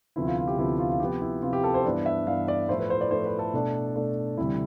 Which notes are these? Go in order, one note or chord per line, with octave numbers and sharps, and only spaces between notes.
D2 C3 F3 B3 E4
F4
F4
G4
D2 C3 F3 B3 E4 G4
F4
F4
C3 F3 B3 G4
E4
C3 F3 B3 F4
G4
A4
C5
G2 E3 B3 D4
E5
G2 E3 B3 D4 F5
D5
A2 F3 A3 E4 C5
B4
C5
D5
A2 F3 A3 E4 C5
B4
A4
B2 A3 D4
B2 A3 D4
D2 C3 E3 G3 E4